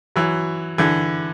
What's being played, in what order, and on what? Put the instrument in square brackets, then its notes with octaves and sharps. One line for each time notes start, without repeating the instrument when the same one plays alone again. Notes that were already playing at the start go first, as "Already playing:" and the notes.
[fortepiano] E3 F#3
D3 E3